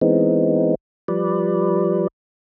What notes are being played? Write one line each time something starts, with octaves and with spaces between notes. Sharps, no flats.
E3 G#3 B3 C4 D#4
F3 G3 B4 D5